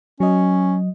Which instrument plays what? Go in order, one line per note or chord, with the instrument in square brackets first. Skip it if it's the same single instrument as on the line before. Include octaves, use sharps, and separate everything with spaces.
[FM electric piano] F#3 D#5 [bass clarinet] C#4